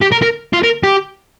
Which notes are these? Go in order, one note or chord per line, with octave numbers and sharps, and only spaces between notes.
G4
A#4
A#4
F4
A#4
G4